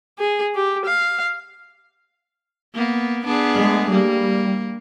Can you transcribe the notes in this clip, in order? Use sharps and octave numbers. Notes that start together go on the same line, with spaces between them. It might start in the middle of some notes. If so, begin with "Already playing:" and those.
G#4
G4
F5
A#3 B3
B3 D4 G#4
G#3 A3
G3 A#3